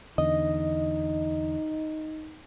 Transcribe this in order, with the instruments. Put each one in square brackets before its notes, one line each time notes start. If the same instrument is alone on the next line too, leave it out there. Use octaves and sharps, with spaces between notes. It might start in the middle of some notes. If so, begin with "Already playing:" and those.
[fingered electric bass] E2 D3 [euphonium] D#4 [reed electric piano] D#5